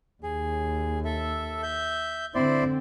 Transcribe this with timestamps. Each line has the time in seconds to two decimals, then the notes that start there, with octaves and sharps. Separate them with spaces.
0.23 D#2 G#4
1.05 A4 E5
1.63 E5 G6
2.35 D3 C4 E4 C5 D5